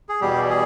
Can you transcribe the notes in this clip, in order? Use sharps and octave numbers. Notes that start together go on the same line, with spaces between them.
G#4
E2 B2 G3 G4
G#4